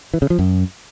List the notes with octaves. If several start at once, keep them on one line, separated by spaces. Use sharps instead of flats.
E3
C#3
F3
F#2